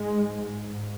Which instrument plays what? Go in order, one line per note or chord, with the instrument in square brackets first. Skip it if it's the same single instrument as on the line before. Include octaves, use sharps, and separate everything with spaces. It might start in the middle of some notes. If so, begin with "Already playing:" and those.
Already playing: [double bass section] G#2 G#3